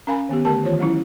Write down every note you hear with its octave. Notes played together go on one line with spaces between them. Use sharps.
C#4 A#4 F5 G#5 B5
D#3 B3 G4
D3 A3 G4 A#4 A5
D#3 E3 F4 C5 C#5
F#3 G#3 C#4 E4